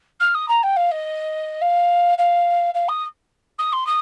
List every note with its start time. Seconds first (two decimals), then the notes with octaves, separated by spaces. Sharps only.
0.20 F6
0.34 D#6
0.48 A#5
0.63 G5
0.76 F5
0.91 D#5
1.61 F5
2.18 F5
2.74 F5
2.88 D#6
3.58 D#6
3.72 C6
3.86 D#6